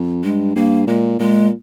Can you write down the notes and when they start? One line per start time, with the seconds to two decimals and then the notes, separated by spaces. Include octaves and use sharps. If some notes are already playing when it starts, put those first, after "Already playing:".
Already playing: F2
0.24 G2 G#3
0.56 G2 A#3
0.87 A#2 G#3
1.19 A#2 G#3